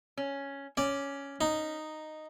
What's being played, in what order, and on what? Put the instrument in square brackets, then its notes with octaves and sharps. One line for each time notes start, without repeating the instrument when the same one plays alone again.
[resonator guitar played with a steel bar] C#4
[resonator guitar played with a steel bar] C#4 [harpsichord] D5
[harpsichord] D#4